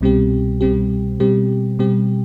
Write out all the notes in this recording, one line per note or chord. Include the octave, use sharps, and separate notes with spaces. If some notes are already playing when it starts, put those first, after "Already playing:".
C2 B2 G3 C4 G4
C2 B2 G3 C4 G4
B2 G3 C4 G4
B2 G3 C4 G4